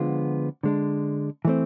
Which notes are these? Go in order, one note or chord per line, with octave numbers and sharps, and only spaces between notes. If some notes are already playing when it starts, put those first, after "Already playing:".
Already playing: D3 F3 G#3 B3 F4
D3 G#3 D4
E3 A3 C4